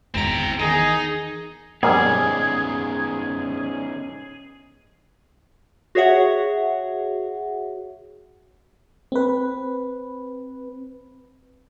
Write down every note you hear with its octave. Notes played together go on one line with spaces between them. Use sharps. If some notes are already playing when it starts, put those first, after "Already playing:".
G#1 E2 C4 A#5 D7
E2 D#3 D#4 G#4
A#1 F#2 G3 B3 C#4 D#4 G#4
F#4 G#4 C#5 E5 F#5
C4 B4